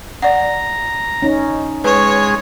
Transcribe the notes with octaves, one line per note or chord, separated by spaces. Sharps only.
D5 F#5 A#5
C#4 D#4
G#3 B4 C#5